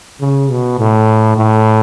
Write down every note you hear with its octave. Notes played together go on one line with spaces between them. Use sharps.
C#3
B2
A2
A2